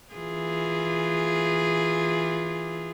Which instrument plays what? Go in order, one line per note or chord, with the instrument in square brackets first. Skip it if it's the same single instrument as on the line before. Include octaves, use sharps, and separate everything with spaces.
[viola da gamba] E3 F4 G#4